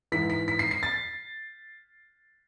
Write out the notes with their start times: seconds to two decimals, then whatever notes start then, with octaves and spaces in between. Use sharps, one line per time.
0.12 G#2 E3 B6
0.30 B6
0.48 B6
0.59 C7
0.71 C7
0.83 A6